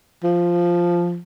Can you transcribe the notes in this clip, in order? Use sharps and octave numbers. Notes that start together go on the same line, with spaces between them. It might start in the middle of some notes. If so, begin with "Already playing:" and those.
F3